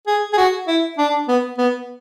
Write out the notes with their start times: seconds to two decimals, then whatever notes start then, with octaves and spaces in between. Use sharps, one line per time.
0.07 G#4
0.33 G#4
0.37 F#4
0.68 E4
0.98 D4
1.28 B3
1.58 B3